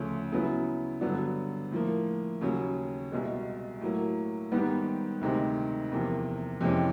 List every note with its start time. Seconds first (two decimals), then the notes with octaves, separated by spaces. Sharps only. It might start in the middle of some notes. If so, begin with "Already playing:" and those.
Already playing: D2 C#3 F3 A3
0.32 C#3 F#3 B3 E4
1.01 G2 D3 F#3 B3 D4
1.71 A2 F3 A#3
2.41 D#2 C#3 F#3
3.12 C2 B2 G#3
3.81 A2 F#3 A#3
4.52 G#2 D#3 G3 B3
5.21 D2 C3 D#3 G#3
5.92 E2 C3 F3 A#3
6.61 F2 C3 E3 G#3 C#4